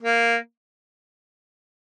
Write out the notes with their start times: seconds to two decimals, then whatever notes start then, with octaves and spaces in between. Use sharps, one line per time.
0.03 A#3